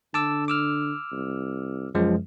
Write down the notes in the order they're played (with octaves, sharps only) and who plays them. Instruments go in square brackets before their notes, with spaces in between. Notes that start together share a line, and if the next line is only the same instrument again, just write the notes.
[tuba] D3 [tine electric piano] A5 D6 E6
[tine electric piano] D6 E6 F6
[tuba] C2
[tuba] C#2 [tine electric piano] F#2 F3 G#3